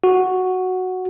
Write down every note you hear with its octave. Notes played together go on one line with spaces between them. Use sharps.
F#4